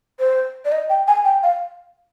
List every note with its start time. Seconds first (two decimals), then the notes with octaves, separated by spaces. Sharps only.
0.19 C5
0.65 D5
0.72 D#5
0.90 G5
1.08 G#5
1.25 G5
1.43 F5